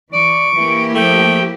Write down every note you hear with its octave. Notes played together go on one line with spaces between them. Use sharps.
E3 D5 C#6 D7
E3 A#3 E4 G4
F3 A3 G5